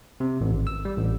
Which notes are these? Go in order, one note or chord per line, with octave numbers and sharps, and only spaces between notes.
C3
A1
G#1
E6
G3
A1